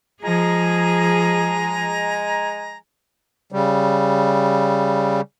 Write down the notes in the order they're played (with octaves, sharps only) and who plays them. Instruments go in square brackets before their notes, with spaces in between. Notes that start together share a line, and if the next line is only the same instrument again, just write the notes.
[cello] F3 G#4 [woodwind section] G#3 G#5 A#5
[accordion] C#3 G3